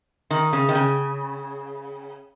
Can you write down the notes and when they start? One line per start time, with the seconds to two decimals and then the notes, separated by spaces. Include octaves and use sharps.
0.31 D#3
0.53 C#3
0.69 D#3
0.75 C#3